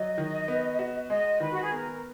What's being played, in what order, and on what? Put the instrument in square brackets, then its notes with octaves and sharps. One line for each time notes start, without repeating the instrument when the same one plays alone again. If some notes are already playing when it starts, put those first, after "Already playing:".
Already playing: [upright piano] F#3 [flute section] D#5
[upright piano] D#3
B3
F#4
[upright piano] G#3 [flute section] D#5
[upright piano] D#3 [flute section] B4
[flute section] F#4
G#4
[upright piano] B3 [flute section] A#4